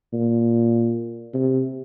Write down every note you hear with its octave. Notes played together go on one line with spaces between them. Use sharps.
A#2
C3